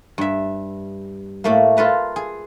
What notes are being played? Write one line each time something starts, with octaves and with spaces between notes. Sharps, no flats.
G2 E5
A2 A3 A#3
F4 A4 B4 A#5
G#4